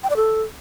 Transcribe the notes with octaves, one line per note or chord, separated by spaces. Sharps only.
G5
D5
A4